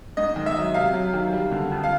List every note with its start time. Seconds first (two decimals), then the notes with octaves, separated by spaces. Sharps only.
0.17 G#2 D#5
0.36 D#3
0.46 E5
0.56 F#3
0.74 C3 F5
0.93 F#3
1.14 D#3
1.32 G3
1.52 D3
1.71 F2
1.83 F5